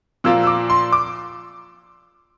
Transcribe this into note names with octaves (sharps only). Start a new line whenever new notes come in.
A#2 F3 A#3 F4 E6
E6
D6
C6
D6